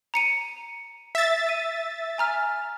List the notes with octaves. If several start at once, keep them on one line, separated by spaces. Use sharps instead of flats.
A#5 C#7 D#7
E5 A6
D#7
G#5 A#5 F6